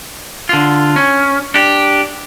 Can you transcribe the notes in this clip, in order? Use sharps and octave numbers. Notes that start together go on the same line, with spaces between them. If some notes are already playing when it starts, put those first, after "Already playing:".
D3 F4
C#4
D4 G4